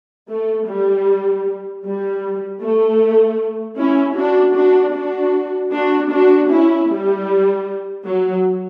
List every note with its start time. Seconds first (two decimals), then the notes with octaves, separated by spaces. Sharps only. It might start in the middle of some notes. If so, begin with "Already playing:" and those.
0.29 A3
0.67 G3
1.84 G3
2.62 A3
3.78 C#4 E4
4.17 D4 F#4
4.55 D4 F#4
4.94 D4 F#4
5.72 D4 F#4
6.11 D4 F#4
6.50 C#4 E4
6.89 G3
8.05 F#3